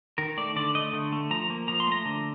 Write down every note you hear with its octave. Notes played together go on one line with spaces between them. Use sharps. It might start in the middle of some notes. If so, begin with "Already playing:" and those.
D#3 A#4
A3 D5
D3 D5
A3 D#5
D3
A3
F3 A#5
A#3
F3 A#5
C6
A3 A#5
D3